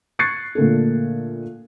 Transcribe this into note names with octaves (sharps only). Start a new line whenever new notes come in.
C#6 F#6 G#6 A6 C7 C#7
A#2 D3 A3 A#3 A4